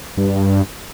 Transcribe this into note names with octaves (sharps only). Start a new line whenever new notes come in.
G2